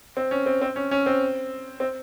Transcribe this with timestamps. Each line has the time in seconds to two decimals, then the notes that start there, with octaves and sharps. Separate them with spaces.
0.17 C4
0.31 C#4
0.46 C4
0.61 C4
0.76 C#4
0.91 C#4
1.06 C4
1.80 C4